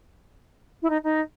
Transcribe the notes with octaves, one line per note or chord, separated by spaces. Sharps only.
E4
D#4
D#4